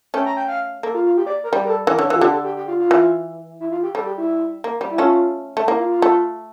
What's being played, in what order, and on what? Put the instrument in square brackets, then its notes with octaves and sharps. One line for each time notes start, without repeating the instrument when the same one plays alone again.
[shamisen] A3 C#4 [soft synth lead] G5
[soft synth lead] A#5
G5
F5
[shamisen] A#3 [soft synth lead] A4
[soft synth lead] F4
F4
G4
D5
A#4
[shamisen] G3 [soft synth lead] G4
[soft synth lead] A#4
A4
[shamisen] E3 [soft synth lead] A#4
[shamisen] D3 [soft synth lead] C#5
[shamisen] E3 [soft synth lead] A4
[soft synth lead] F4
[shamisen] D3 [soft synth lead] G4
[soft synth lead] A4
G4
G4
F4
F4
[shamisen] E3
[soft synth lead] E4
F4
G4
[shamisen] G3 [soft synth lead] A4
[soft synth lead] G4
E4
[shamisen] A#3
G3
[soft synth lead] E4
[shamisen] A3 C#4 [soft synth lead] F4
[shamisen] A3
[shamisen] A#3 [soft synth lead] E4
[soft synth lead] F4
F4
[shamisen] A3